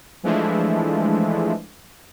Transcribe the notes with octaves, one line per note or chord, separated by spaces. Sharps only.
E3 F3 G#3 A3 D4 E4